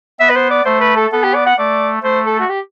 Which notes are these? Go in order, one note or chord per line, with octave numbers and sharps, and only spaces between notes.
B3 E5
B4
C5
D5
A3 C5
B4
A4
B3 A4
G4
D5
F#5
A3 D5
A3 C5
A4
F#4
G4